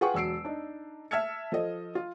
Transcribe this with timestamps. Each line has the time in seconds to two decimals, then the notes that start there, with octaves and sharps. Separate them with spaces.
0.01 F4 G#4 B4 F#5 G5 C#6
0.14 E1 F#3 E6 C7 D7
0.45 D4 D#4
1.11 E5 A5 E6 F6 G#6 C#7
1.52 F3 A4 D#5
1.95 F4